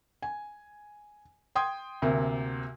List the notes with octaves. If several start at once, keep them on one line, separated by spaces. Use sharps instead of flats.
G#5
G5 C6 D#6 G#6
D2 C3 A#3